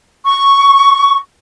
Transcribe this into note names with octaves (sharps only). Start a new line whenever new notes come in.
C#6